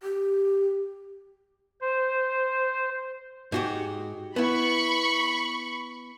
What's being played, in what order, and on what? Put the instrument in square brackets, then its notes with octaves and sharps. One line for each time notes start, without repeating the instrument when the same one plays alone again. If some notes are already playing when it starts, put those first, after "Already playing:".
[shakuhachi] G4
[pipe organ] C5
[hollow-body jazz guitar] G#2 F#4 G4
[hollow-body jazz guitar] B3 E4 [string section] B5 C#6